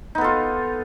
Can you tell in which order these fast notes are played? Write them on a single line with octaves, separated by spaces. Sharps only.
D#4 B3 A4 F4